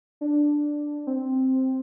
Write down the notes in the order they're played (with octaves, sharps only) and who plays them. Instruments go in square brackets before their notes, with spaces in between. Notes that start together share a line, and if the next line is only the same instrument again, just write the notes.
[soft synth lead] D4
C4